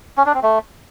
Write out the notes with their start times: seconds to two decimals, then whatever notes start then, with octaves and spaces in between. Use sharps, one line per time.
0.17 C#4
0.26 D4
0.34 C4
0.43 A3